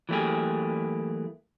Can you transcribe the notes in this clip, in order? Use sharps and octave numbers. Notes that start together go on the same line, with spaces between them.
E3 F#3 A3 A#3 G4 G#4